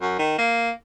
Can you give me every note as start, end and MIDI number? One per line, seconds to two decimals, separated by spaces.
0.01 0.14 42
0.19 0.37 51
0.39 0.70 58